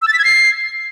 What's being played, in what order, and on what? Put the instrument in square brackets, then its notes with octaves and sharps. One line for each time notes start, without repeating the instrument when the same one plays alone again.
[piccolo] E6
A6
B6
G#6
C7